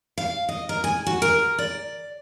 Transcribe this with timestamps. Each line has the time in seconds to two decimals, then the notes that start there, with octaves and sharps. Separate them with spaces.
0.18 F5
0.49 D#5
0.69 A#4
0.84 G#5
1.07 F#4
1.22 A#4
1.59 D5